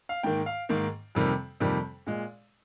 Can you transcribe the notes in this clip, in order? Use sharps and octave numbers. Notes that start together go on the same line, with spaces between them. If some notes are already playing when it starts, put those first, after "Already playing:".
F5
G#2 D#3 A#3 G5
F5
G#2 D#3 A#3
F2 C3 D#3 G3 A#3
F2 C3 D#3 G3 A#3
A#2 G#3